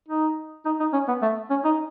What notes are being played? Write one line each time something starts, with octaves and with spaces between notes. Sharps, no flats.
D#4
D#4
D#4
C#4
B3
A3
C#4
D#4